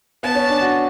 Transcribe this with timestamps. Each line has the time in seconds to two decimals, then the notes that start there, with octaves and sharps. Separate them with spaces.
0.23 B3 A5
0.35 C#4
0.49 D4
0.61 F#4